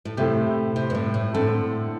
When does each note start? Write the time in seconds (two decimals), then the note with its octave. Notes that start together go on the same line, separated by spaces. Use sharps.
0.05 A2
0.17 A2 C3 A3 E4 G4
0.76 C3
0.90 G2
0.95 A2
1.14 A2
1.34 A2 D3 C4 A4